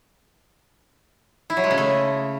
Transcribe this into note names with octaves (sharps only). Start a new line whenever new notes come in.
E4
F#3
G#3
C#3
A3